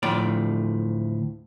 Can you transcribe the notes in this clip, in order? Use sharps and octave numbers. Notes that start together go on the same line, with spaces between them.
D2 A2 F3 D5